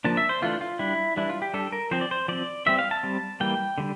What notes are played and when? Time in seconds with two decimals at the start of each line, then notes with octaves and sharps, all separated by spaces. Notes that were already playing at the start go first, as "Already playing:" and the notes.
0.04 F3 A#3 D4 A5
0.17 E5
0.29 C5
0.42 E3 A3 D4 F4
0.61 F4
0.79 G3 D4 E4
1.16 E3 G3 D4 E4
1.29 F4
1.42 G4
1.54 G3 D4 A4
1.72 A#4
1.91 F3 C4 C5
2.01 D5
2.11 C5
2.28 F3 C4 D5
2.66 E3 G3 C4 E5
2.79 F5
2.91 A5
3.03 G3 C4
3.40 E3 G3 A#3 G5
3.78 D3 G3